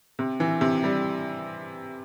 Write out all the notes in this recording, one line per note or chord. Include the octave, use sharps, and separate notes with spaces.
C3
E3
C3
G3